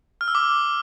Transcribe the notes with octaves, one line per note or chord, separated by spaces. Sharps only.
F6
E6
D6